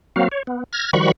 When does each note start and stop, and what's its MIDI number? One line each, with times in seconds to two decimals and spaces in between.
0.16 0.28 54
0.16 0.28 58
0.16 0.28 60
0.16 0.28 66
0.16 0.28 77
0.31 0.43 73
0.47 0.64 59
0.73 0.91 89
0.73 0.91 92
0.73 0.91 94
0.93 1.12 51
0.93 1.12 53
0.93 1.12 55
0.93 1.12 66
0.93 1.12 83
0.93 1.12 85